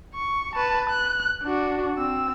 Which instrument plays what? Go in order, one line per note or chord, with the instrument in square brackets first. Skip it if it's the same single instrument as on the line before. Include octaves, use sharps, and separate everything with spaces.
[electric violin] C#6
B4 A5
F#6
D4 F#4
C4 E6